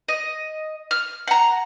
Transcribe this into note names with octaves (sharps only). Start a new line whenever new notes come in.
D#5
F6
F#5 A#5